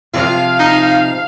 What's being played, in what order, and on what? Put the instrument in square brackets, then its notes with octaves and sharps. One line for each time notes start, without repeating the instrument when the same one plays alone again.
[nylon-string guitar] C3 F3 [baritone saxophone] F4 [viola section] F5
[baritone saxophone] D#4